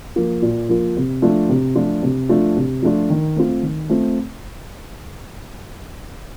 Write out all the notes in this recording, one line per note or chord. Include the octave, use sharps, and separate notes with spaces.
F3 A#3 F4
A#2
F3 A#3 F4
C3
F3 A3 D4 F4
C3
F3 A3 D4 F4
C3
F3 A3 D4 F4
C3
F3 A3 D4 F4
D#3
A3 C4 F4
D#3
A3 C4 F4